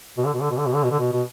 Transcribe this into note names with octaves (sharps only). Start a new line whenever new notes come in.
B2
D3
B2
D3
B2
D3
B2
D3
B2
D3
B2
B2